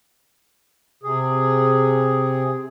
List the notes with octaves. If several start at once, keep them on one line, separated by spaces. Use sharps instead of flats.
C3 G#4